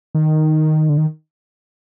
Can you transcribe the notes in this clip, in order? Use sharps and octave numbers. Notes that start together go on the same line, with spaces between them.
D#3
D3
D#3